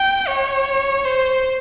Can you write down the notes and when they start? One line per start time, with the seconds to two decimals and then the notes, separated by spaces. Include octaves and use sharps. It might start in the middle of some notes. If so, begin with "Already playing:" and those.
Already playing: G5
0.28 C#5
1.05 C5